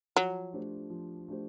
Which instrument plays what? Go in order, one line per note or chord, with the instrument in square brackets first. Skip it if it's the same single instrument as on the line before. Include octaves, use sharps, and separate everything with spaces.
[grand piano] F3 [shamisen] F#3
[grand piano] A3 D4 G4 C5
F3
A3 D4 G4 C5